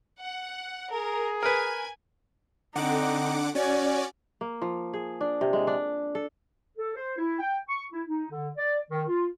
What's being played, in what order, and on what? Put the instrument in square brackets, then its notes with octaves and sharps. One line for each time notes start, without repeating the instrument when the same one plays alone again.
[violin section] F#5
[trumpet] G#4 [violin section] A#4
[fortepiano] A#4 B4 [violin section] G#5
[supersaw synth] D3 F#5 D6 [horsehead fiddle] C4 D#4
[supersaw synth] C#4 D5 [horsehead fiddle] F#4 G#5
[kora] A#3
F3
G#4
D4
C3
G#3
D4
A4
[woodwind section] A4
C5
E4
G5
C#6
E4
D#4
D3
D5
D#3
F4